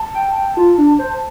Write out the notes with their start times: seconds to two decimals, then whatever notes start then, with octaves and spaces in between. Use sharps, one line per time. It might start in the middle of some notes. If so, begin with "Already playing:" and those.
Already playing: A5
0.15 G5
0.36 G5
0.57 F4
0.78 D4
0.99 C5